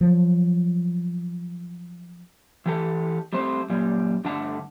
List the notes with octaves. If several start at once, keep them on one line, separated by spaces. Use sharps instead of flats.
F3 F#3
E3 G4 A4
G3 A3 C4 C5
F#2 A#2 G3
G2 D3 A3 D4 F#5 A5